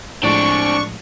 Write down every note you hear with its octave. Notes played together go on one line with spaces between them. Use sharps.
A2 F3 G#3 C4 D4 D5 C#6